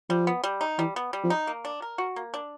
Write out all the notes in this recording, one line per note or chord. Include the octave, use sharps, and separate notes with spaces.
F3 G3
B3
G3
D#4
E3 G3
B3
G3
F3
D#4
A#3
D4
A#4
F#4
A#3
D4